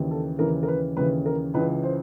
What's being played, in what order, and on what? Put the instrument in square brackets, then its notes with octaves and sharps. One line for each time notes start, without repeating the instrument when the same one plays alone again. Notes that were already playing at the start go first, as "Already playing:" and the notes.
Already playing: [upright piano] D#2 C#3 E3
A4
D#2 C#3 E3 A#4
A#4
B4
D#2 C#3 E3 B4
A#4
C#2 C#3 E3 B4
C5